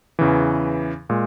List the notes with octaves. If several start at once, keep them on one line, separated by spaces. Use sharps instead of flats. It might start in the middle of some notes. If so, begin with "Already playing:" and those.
E2 C#3 E3
A#2 G#3